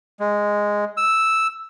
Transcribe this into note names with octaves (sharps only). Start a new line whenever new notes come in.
G#3
E6